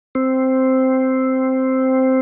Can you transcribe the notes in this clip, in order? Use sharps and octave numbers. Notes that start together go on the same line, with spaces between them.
C4